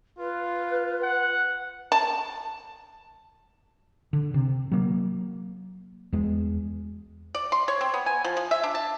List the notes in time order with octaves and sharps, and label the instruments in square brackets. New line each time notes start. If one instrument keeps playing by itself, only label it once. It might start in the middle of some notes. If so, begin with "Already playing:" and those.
[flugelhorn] F4 [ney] B4
[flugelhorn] F#5
[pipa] A5
[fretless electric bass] D3
C3
F#3 A#3
E2 G#3
[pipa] D5
C6
C#5
C4
B3
G#5
F3
F3
E5
D4
A5